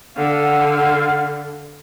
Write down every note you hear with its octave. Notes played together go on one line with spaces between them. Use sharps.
D3 F5 F#5